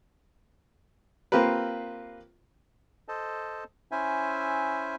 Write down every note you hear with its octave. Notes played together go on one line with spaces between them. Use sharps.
A#3 C4 F4 G4 A#4 B4
A4 C5 D#5 A5
C#4 E4 C5 E5 G#5